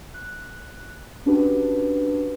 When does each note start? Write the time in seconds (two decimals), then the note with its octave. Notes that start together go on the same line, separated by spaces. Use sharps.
0.14 F#6
1.26 C#4 D4 F#4 G4 B4